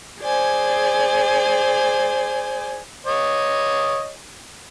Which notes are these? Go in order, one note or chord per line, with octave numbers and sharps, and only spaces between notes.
G#4 C5 D5 G#5
C#5 D#5